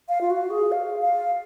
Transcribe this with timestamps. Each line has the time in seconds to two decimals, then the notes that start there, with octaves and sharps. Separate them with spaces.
0.09 F5
0.21 F4
0.30 F#4
0.50 G#4
0.72 F5
1.02 F5